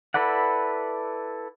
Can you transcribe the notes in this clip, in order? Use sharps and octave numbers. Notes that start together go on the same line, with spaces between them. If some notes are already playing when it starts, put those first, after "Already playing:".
E4 A4 B4 D5 F#5